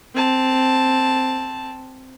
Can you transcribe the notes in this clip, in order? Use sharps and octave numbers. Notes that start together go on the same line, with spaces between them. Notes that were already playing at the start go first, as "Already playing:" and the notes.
C4 A5